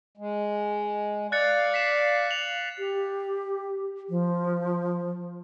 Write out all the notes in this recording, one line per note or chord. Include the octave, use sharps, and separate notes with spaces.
G#3
D5 F5 F#6 A6 C#7
B6 C7 E7
F7 F#7
G4
F3